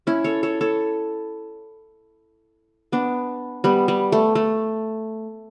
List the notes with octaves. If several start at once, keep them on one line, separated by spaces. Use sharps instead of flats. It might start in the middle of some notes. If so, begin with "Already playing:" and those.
C#4 E4
A4 C#5
A4 C#5
A4 C#5
B3 D4
G3 B3
G3
A3
A3